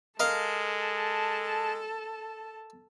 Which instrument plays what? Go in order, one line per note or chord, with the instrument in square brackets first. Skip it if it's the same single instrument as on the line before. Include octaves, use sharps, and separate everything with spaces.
[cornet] G#3 [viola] A4 A5 [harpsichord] A#4 D#5 F5